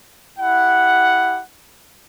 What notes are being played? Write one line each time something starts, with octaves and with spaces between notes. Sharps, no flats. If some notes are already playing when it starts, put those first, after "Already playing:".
E4 G4 F#5